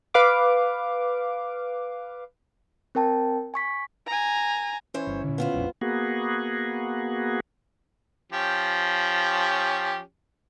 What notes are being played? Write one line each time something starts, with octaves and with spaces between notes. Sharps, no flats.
B4 F5 D6
C4 A#4 G5 A5
G#5 C#6 B6
G#5 A#5
E3 C#4 E4 C5 C#5
G1
A#2 D3
B3 F4 C5
E1 A#1 F2
A#3 B3 F#4 G#4
F3 C#4 G4